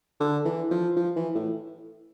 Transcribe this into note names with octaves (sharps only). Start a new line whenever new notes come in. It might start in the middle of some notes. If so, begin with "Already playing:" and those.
D3
E3
F3
F3
E3
A2